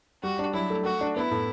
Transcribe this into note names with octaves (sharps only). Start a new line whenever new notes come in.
G3 F#4
D4
F#3 E4
A3
A3 F#4
D4
B3 E4
A2